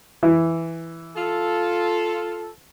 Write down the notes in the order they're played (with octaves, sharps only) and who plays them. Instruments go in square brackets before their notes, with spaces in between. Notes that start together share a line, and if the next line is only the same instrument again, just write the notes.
[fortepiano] E3
[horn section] F4 A4